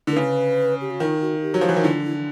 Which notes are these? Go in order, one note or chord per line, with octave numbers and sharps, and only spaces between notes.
D3 A#4
C#3 B4
G4
F#4
D#3 F4
F#4
G4
F#3
F3
E3
D#3 E4
D3 F4
E4